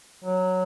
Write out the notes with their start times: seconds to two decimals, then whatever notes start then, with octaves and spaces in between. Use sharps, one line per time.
0.24 F#3